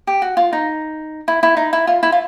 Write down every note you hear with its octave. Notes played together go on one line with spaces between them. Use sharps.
G4
F#4
F4
D#4
E4
E4
D#4
E4
F4
E4
F4